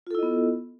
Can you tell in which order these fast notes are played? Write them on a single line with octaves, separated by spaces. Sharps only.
F4 A4 E4 D#5 B3